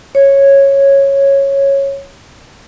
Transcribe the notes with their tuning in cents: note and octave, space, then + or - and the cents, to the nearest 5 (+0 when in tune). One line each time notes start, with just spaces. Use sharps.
C#5 -10